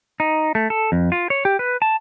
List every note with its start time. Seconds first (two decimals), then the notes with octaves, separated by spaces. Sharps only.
0.20 D#4
0.55 A3
0.70 A4
0.92 F2
1.12 F4
1.30 C#5
1.45 G4
1.59 B4
1.82 A5